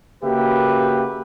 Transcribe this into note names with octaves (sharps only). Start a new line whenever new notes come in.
C#3 A#3 F#4 G4 B4 E5